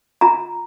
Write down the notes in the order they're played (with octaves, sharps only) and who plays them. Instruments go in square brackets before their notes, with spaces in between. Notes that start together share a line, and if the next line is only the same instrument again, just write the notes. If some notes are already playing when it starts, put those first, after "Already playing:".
[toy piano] F4 A#5